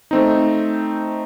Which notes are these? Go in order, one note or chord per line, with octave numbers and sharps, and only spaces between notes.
A3 C4 D#4